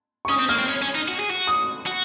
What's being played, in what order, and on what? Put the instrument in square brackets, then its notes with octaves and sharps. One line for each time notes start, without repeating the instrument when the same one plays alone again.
[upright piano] C#6
[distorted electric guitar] C#4 [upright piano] D#6
[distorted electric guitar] C4
[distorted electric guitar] A#3 [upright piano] F6
[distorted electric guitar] C4
C#4
C#4
D#4
F#4
G#4
F#4
[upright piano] D#6
[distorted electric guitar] F#4